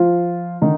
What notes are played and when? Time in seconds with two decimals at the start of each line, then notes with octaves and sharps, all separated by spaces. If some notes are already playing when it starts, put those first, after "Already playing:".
Already playing: F3 F4
0.61 D3 D#3 D#4